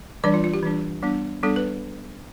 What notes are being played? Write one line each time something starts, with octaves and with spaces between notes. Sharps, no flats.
E3 G3 D4 D5
F4
F4
G4
E3 G3 D4
G3 B3 D4
G3 B3 D4 A4
B4